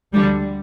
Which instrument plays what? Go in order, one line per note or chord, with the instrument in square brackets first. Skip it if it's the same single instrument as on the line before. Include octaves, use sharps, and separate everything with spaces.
[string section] D2 D3 G3